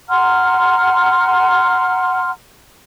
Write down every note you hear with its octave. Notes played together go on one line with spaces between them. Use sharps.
F#5 A#5 C6 F6